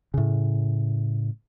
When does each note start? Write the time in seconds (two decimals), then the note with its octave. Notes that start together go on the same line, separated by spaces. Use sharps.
0.14 A2 C#3